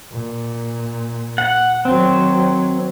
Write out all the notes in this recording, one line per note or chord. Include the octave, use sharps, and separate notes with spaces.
A#2
F#5
D#3 F#3 C4